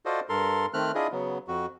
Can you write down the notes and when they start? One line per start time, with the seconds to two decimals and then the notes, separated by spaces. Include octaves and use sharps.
0.06 F4 F#4 A4 C5 D5 D#5
0.29 G2 A4 A#4 C6
0.74 D#3 A3 C4 F6 F#6
0.95 D4 E4 F4 G#4 D#5
1.12 C#3 F#3 B3
1.48 F2 F#4